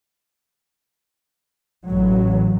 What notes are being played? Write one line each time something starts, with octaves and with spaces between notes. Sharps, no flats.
A1 F#3